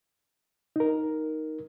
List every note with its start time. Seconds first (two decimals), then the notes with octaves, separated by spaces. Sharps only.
0.76 D#4 A#4